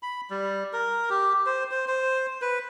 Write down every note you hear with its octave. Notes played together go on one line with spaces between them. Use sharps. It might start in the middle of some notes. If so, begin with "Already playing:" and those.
B5
G3
A#4
G4
C5
C5
C5
B4